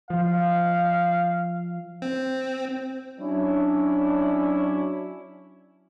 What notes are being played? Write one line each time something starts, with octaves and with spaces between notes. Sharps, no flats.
F3 F5
C4
F#3 C#4 D4 E4